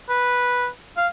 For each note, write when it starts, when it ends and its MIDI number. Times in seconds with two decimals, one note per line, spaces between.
0.09 0.68 71
0.97 1.08 77